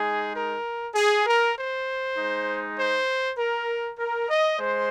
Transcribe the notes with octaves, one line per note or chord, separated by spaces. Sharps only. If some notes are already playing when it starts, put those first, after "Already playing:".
Already playing: G#3 D#4 G#4
A#4
G#4
A#4
C5
G#3 D#4
C5
A#4
A#4
D#5
G#3 C5